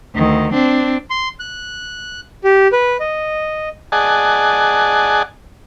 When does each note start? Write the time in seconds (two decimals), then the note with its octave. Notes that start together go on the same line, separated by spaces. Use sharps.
0.15 D2 D#3
0.53 C4 D4
1.10 C6
1.40 F#6
2.44 G4
2.72 B4
3.00 D#5
3.92 G#4 D5 D#5 F#5 G#5 A5